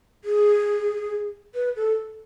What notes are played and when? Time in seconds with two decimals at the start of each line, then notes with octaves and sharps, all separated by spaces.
0.25 G#4
1.54 B4
1.76 A4